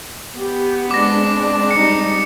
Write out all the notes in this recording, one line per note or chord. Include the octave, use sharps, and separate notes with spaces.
B3 G4
G#3 C4 D4 D6 A#6
G3 D#4 C#7